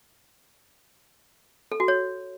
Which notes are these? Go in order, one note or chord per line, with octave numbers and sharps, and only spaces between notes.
A4
F#4
C#5